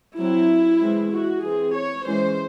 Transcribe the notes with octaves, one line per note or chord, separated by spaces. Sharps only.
F#3 C4 E4
E3 G#3 C4
F#4
E3 C4 G#4
C#5
E3 G#3 C#4 C5